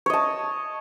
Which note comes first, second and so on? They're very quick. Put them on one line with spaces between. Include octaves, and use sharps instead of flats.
C#5 D#5 A5